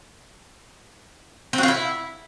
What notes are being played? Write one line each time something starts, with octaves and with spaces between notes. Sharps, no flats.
C4
F#4
F4
E4